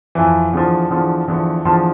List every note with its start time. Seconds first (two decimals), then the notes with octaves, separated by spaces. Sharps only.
0.15 F2 E3
0.53 E2 D3 F3
0.90 E2 D3 F3
1.28 E2 D3 F3
1.65 E2 D3 F3 A5 C6